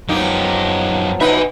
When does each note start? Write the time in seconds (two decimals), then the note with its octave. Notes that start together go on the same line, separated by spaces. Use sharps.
0.09 F#2 F3 F#3 A#3 B3 D#4 G4
1.21 B2 D#4 B4 E5 G#5